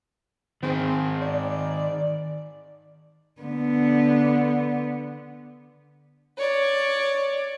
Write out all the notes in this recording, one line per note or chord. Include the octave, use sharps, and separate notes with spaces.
D#3 C4 G#4
D5
D3 B3
C#5 D5